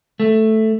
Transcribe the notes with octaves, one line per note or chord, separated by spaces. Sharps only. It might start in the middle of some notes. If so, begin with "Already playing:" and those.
A3